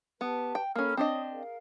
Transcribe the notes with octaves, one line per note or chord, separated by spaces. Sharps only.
B3 G4 B4 A5
G5
A#3 C#4 A4 B5 F6
C4 D4 C#5 D#5 D#6
G#4 A#4 F5